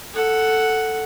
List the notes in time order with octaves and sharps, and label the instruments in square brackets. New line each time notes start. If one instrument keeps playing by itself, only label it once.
[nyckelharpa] A4 F#5